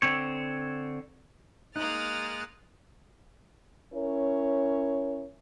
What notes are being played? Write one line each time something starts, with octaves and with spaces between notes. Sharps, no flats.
D3 C4 C#5
G#3 A#3 D#4 D#6 F6 F#6 A6
C#4 E4 A#4 C#5